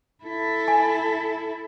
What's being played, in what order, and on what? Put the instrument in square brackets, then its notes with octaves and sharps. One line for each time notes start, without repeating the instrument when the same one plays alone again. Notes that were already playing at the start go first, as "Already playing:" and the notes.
[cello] E4 A4
[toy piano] G#5